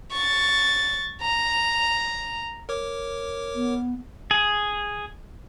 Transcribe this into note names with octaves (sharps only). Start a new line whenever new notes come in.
C#6 A6
A#5
A#4 C#5 D6
B3
G#4